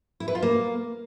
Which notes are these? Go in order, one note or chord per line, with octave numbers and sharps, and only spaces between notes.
E4
B4
F4
A#3